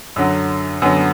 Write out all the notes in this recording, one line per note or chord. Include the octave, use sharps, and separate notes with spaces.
F#2 D3 F#3
F#2 D3 F#3 B3